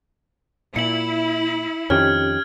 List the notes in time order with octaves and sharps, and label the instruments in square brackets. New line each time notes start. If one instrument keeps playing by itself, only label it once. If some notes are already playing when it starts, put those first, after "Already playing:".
[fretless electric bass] A#2 [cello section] E4 [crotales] C#7 F#7
[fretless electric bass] F2 D#3 [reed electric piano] C#4 G4 [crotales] F6 G#6